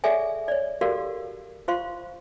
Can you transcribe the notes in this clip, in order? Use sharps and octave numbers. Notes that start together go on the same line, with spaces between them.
G#4 A4 C#5 D5 E5 G#5
C#5 D5
F#4 G4 A4 A#4 D5 F5
F4 C5 F5 C6 C#6